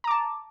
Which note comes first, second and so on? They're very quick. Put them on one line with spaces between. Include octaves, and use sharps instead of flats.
A#5 D6 A5